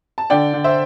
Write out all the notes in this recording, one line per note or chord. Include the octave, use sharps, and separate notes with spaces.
A5
D3 D5 G5
D3
C5 E5